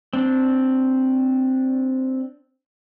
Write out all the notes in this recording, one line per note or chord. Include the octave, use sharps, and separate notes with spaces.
C4 D4